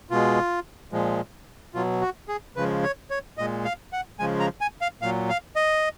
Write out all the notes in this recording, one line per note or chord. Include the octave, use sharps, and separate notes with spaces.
B2 G#3 F4
A#2 F3 G#3
B2 F#3 F4
F#4
G#4
C#3 F3 G#3 B4
C#5
C#5
A#2 G#3 D#5
F5
F#5
C#3 F3 G#3 G#5
A#5
G#5
F5
A#2 F#3 F5
F5
D#5